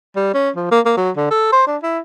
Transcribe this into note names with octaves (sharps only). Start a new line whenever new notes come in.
G3
C#4
F3
A#3
A#3
F#3
D3
A4
C5
D4
E4